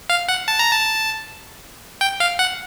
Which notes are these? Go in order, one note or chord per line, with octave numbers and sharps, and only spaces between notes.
F5
F#5
A5
A#5
A5
G5
F5
F#5